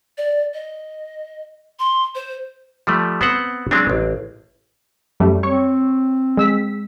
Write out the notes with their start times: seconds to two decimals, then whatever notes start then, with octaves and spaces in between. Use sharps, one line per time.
0.18 D5
0.54 D#5
1.79 C6
2.15 C5
2.87 F3 G3 A3
3.21 B3 C4 C5 F#5
3.71 F#3 G#3 C4 D4
3.90 A1
5.20 F#2 G3 A3
5.43 C4 C#5 C#6
6.37 G#3 E6 B6